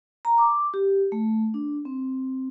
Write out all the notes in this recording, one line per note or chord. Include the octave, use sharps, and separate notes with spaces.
A#5
D6
G4
A3
D4
C4